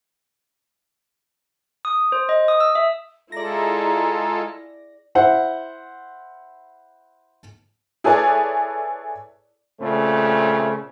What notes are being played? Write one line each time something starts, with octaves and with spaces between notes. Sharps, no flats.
D#6
C5
D#5
D#6
E6
E5
G#3 E4 F4 G#4 A4 D5 A#5 A#6
E4 C5 F#5
E4 G#4 A4 B4 C#5 D5
A#2 C#3 A3 C4